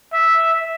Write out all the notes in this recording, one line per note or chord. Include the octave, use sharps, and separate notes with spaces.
E5